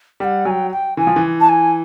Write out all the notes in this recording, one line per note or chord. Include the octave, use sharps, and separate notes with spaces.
G3 F#5 G5
F#3 G5 G#5
G5
E3 G#5
F3
E3
A5
G#5